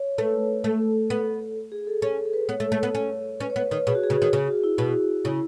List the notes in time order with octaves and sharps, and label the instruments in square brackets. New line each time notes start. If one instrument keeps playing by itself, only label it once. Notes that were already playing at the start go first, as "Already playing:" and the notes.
Already playing: [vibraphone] C#5
[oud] A3 [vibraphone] B4
[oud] A3 [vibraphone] A4
[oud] B3
[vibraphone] G#4
A4
[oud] C#4 [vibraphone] A4
[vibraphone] A4
B4
[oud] B3 [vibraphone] C#5
[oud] A3
A3
B3
C#4
[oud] C#4 [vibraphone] B4
[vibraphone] C#5
[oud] B3
[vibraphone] B4
[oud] D#3
[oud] B2 [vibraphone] G#4
[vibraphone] F#4
G#4
[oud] C#3
D#3
[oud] C#3 [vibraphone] G#4
[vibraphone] F#4
E4
[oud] B2 [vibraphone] F#4
[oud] C#3 [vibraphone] E4